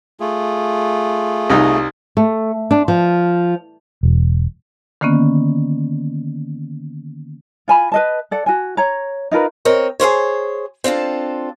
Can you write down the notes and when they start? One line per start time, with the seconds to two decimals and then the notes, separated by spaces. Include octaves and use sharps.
0.20 A3 F4 G#4
1.50 C2 D#4
2.17 A3
2.71 D4
2.88 F3
4.03 E1
5.01 D3 D#3 A#3 B3 C#4
7.68 F4 G#5 B5
7.92 B4 D#5 A5
8.31 A4 D5 F#5
8.46 F#4 G#5
8.77 C#5 A#5
9.31 D#4 F4 A#4 B4
9.65 C4 A#4 C#5 D#5
10.00 G#4 A#4 C5 C#5
10.84 C4 D4 F4 A4